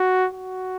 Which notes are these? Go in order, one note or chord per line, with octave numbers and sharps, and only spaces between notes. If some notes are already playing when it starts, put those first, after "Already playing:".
Already playing: F#4
F#4